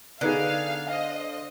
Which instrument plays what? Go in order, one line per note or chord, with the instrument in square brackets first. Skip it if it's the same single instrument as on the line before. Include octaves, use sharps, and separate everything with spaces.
[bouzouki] D3 [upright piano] B3 D#4 G#4 [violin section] F5
[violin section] C5 D#5 [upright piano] F5